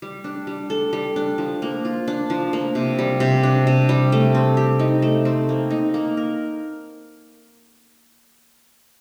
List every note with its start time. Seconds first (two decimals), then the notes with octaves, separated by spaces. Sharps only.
0.02 G3
0.24 D4
0.47 G3
0.70 A4
0.93 G3
1.16 D4
1.38 F3
1.62 A#3
1.85 F4
2.08 D4
2.30 F3
2.53 A#3
2.75 C3
2.99 G3
3.20 C3
3.43 D4
3.67 C3
3.89 G3
4.12 A3
4.35 C4
4.57 G4
4.79 D#4
5.02 A3
5.25 C4
5.49 A#3
5.70 D#4
5.94 A#3
6.17 A#4